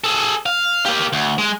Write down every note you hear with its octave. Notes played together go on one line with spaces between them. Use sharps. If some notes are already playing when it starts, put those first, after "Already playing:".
G#4 A4
F5
A#3 G4
D2
G#3